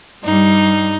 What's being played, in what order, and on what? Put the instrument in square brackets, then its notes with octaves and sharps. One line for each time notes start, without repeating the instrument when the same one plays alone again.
[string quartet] G2 G3 D#4